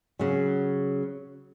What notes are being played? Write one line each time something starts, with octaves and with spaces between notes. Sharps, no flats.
C#3 F#3